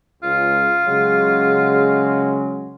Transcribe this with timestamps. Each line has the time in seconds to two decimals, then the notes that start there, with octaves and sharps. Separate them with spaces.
0.23 C#2 F4
0.87 C#3 F#3 G#3